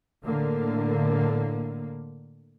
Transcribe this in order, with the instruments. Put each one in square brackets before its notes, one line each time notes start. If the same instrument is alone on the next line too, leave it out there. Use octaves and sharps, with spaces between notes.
[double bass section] A2 D3 A#3